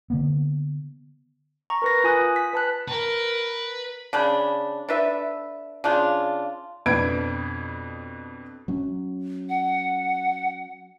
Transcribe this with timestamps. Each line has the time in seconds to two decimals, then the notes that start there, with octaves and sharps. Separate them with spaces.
0.10 D3 A#3 B3
1.70 A#5 C#6
1.82 A#4 B4 A#6
2.04 F4 G#5 D#6 F#6
2.36 B6
2.53 B4 A5 F#6
2.88 A#4 B4
4.13 C#3 D4 B5
4.89 D4 A4 B4 E5
5.84 C#3 D4 F4
6.86 F2 B2 D4 B4 G#6 D7
8.68 F#3 C#4
9.49 F#5